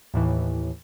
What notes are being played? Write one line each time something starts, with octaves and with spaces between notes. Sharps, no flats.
D#2 A2 E3